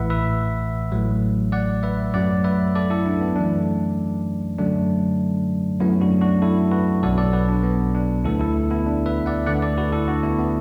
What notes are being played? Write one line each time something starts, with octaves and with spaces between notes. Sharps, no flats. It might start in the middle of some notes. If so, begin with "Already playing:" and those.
Already playing: A1 A2 E3 B4 E5 F#5
B4 E5
A1 A2 F#3 A3
D5 F#5
B4 E5
F#2 F#3 A3 D5 F#5
B4 E5
A4 D5
E4 A4
D4
B3
F#2 E3 A3 D4
F#2 D3 F#3 A3 D4
F#2 F#3 A3 B3 E4
D4 F#4
D4 F#4
E4 A4
F#4 B4
B1 B2 F#3 A4 D5
A4 D5
F#4 B4
D4
B3
D4
D2 D3 A3 E4 A4
E4 A4
B3 E4
D4
B4 E5
D5 F#5
D2 D3 A3 D5 F#5
A4 D5
F#4 B4
E4 A4
D4 F#4
B3 E4
B3